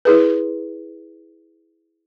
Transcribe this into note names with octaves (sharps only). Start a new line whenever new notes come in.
E4 G#4 B4